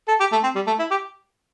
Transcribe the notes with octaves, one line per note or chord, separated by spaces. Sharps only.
A4
G4
A3
C4
G3
A3
E4
G4